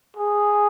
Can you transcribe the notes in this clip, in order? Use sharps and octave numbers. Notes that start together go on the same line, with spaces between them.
G#4